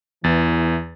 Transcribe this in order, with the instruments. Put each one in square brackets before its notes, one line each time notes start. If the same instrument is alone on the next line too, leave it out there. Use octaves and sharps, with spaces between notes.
[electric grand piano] E2 A6 [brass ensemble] E3